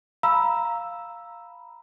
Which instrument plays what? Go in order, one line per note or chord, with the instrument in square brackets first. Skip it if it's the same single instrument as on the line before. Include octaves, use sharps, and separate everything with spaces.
[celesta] F5 A#5 B5 E6